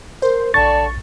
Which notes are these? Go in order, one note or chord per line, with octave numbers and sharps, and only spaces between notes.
A#4 C5
A#1 D3 D5 A5 C#6 A6